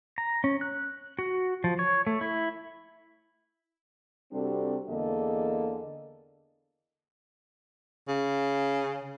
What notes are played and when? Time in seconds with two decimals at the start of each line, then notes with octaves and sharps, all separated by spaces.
0.18 A#5
0.44 C#4
0.61 F#6
1.19 F#4
1.64 F3
1.79 C#5
2.07 A3
2.21 E4
4.32 C3 G3 C4 D4 F#4 A4
4.89 E2 D3 A#3 G#4 A4 D#5
8.09 C#3